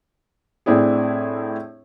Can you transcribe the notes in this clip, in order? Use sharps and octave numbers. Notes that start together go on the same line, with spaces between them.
A2 C4 D4 E4 G#4